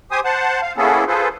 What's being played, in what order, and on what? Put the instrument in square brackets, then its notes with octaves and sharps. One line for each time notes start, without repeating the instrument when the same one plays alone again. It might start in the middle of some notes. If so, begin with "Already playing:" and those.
[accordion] G4 C5 G#5 D#6
C5 F#5 A5
F5
A#3 B3 C#4 E4 G#4 A4
F4 G#4 A4 B4 C5